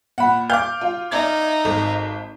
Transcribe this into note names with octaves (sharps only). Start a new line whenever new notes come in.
A#2 F#5 B5
F5 D6 G6
F4
D#4 D5 E5 G#6
G#1 A4